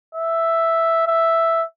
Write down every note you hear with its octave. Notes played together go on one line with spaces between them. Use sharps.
E5
E5